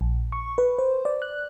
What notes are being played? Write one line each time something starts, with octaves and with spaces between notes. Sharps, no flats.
A#1
C#6
B4
C5
D5
F#6